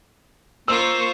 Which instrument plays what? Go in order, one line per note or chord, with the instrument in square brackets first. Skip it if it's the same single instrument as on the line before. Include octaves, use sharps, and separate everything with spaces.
[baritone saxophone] A#3 [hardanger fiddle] F4 [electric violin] C5 C#6 [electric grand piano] E6